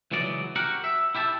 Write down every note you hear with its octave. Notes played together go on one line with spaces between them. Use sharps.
C#2 E3 F#3 D5 D#5
F#4 G4 A#4 F#5
E5
E4 G4 E5 A5